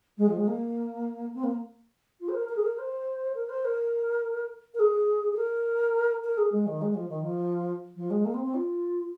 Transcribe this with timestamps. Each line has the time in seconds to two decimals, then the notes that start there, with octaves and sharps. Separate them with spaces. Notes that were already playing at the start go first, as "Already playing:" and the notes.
0.17 G#3
0.28 F3
0.37 G#3
0.47 A#3
1.34 C4
1.43 A#3
2.20 F4
2.28 C5
2.34 A#4
2.48 A#4
2.56 G#4
2.62 A#4
2.78 C5
3.34 A#4
3.49 C5
3.64 A#4
4.74 A#4
4.79 G#4
5.32 G#4
5.36 A#4
6.24 A#4
6.37 G#4
6.52 G#3
6.66 D#3
6.81 G#3
6.94 F3
7.08 D#3
7.22 F3
7.95 F3
8.10 G#3
8.24 A#3
8.34 C4
8.44 C4
8.54 F4